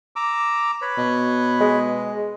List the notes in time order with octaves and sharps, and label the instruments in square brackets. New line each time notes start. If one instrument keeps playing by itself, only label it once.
[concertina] A#5 D6 E6
B4 C#5 B5
[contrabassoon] B2
[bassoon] G#3